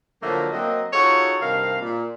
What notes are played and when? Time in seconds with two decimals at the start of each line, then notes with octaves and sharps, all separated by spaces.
0.22 A2 D3 F3 F#3 A3 A#3
0.52 F#3 A#3 C4 D#5
0.93 D#4 F4 F#4 G#4 A4 C#5
1.41 G2 C3 D#3 A#4 F5
1.82 A#2